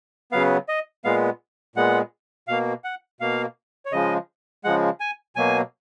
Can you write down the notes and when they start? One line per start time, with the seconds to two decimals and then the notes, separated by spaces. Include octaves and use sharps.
0.32 C#3 F#3 B3 F5
0.69 D#5
1.05 A#2 G#3 B3 F5
1.76 A#2 G#3 B3 F#5
2.48 B2 A#3 F5
2.84 F#5
3.21 B2 A#3 F5
3.86 C#5
3.92 C#3 F3 G#3 D#5
4.64 C#3 F3 G#3 F#5
5.00 G#5
5.36 B2 F#3 A#3 G#5